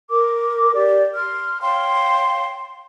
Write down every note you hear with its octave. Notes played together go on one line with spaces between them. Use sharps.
A#4 D6
G4 D5
C6 F6
C#5 F5 G5 C6